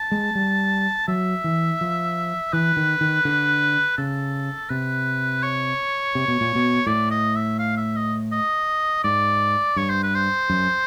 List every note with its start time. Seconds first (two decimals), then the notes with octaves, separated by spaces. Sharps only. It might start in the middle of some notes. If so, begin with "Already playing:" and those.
Already playing: A5
0.12 G#3
0.35 G3
1.08 F#3 E5
1.44 E3
1.81 F3
2.53 E3 B4
2.77 D#3
3.01 D#3
3.25 D3
3.98 C#3 A4
4.70 C3 B4
5.43 C#5
6.15 C3
6.28 B2
6.41 A#2
6.55 B2
6.87 A2 D5
7.11 D#5
7.36 E5
7.59 F5
7.77 E5
7.96 D#5
8.32 D#5
9.04 G#2 D5
9.76 G2 C#5
9.90 C5
10.03 B4
10.15 C5
10.50 F#2